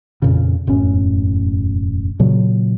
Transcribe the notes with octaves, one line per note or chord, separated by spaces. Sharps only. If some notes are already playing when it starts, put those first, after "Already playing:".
F2 A#2 C#3
E1 F#2 A2 C#4
A#2 C#3 F#3